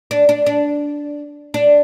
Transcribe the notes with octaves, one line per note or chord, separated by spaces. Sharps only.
D4
D4
D4
D4